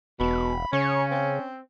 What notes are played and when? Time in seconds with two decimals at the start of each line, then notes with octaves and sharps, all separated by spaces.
0.20 E1 B2 B5
0.73 C#3 C#4 C#5
1.11 C4